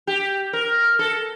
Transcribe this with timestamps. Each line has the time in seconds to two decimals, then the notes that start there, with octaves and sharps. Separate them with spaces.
0.07 G4
0.53 A#4
0.99 A4